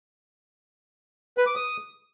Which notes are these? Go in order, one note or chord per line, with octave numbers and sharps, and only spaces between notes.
B4
D6
D#6